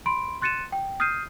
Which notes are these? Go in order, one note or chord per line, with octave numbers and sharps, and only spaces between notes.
B5 C6 D7
C6 F#6 A6 C#7 D#7 E7
G5
D#6 F6 G6 C7 D#7